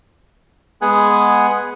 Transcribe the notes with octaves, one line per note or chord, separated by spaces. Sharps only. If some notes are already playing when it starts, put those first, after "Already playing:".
G#3 B3 G#4 F#5 G#5